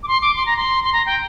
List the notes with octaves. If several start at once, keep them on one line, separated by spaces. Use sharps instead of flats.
D6
C6
D6
C6
A#5
C6
C6
A#5
G5